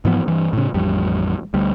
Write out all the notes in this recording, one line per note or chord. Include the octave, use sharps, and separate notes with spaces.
G#2 E3 F3 B3
G2 E3
A2 C#3
A1 F2 G3
D2 G3